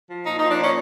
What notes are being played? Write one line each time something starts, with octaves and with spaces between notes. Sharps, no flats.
F3
A#2 D#4
D#4
F3
D4
A#2 C#4